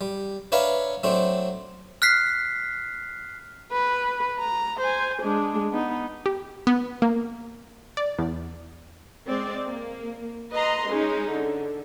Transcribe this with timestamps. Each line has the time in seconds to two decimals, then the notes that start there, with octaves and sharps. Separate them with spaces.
0.01 G3
0.52 D4 B4 C#5 E5 F5 A#5
1.03 F#3 A3 C4 D4
2.02 F6 F#6 B6 C7
3.72 B4
4.39 A#5
4.80 C5 G#5
5.22 G#3 D4
5.72 B3 D#4
6.26 G4
6.67 B3
7.02 A#3
7.97 D5
8.18 E2
9.27 G#3 C4 D5
9.67 A#3
10.53 B4 D#5 A#5 C6
10.89 G#3 C#4 D#4
11.31 D3